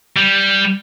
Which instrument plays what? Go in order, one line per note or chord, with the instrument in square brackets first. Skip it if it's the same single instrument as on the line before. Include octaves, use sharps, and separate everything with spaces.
[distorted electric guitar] G3